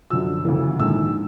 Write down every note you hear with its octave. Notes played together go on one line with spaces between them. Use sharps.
F#2 D3 F3 E6
D2 C#3 E3
A#1 G#2 D#3 G#3 E6